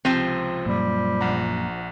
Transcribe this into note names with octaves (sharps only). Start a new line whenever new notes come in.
C#2 C3 F3 C4 D#7
F#2 A#2 G3
A#1 F#5 A#5